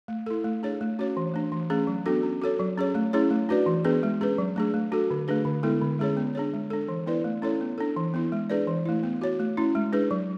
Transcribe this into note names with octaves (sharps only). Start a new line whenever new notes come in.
A3
E4 A4
A3
D4 G#4 C#5
A3
C#4 F#4 C#5
E3
A3 D4
E3
A3 C#4 G#4
F#3
B3 D4 F#4 A4
C#4
F#4 A4 C#5
F#3
C#4 G#4 C#5
A3
C#4 E4 G#4 C#5
A3
D4 F#4 B4 D5
E3
B3 D4 G#4 B4
G#3
C#4 G#4 B4
F#3
A3 D4 G#4
A3
D4 F#4 A4
D3
A3 D4 G#4 B4
D3
G#3 B3 E4 A4
D3
G#3 C#4 G#4 C#5
B3
D4 G#4 C#5
G#3
D4 A4
E3
B3 E4 B4 D5
A3
C#4 E4 A4 C#5
B3
D4 A4
E3
B3 E4
G#3
D4 G#4 B4 D5
E3
A3 E4
B3
F#4 C#5
A3
C#4 E4
G#3
D4 G#4 B4
F#3